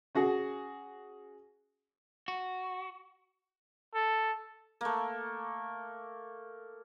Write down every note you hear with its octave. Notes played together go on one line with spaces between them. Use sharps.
C#4 F#4 G#4
F#4
A4
A3 A#3